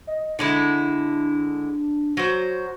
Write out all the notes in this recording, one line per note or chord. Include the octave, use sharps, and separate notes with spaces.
D#5
D3 G#3 D4 E4
F#3 C5